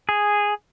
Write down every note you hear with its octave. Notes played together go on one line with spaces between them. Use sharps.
G#4